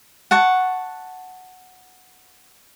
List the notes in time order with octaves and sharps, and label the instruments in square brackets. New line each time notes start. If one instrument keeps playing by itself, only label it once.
[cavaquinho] F#5 A5 C#6